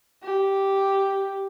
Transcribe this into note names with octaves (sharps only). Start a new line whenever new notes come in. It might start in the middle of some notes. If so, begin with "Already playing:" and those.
G4